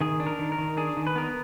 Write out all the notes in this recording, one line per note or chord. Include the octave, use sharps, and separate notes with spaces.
D#3 G#4
D4
A#4
D#3
A#4
D#3
D4 G#4
D#3
B4
B3 A#4